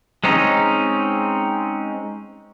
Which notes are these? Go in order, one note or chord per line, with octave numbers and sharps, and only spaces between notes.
G#3 C4 C#4 D#4